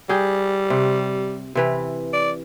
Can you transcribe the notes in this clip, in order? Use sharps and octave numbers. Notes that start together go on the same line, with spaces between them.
G3 G#4 G5
C3
C3 E3 B4
D5